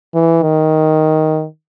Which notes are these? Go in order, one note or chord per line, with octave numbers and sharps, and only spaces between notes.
E3
D#3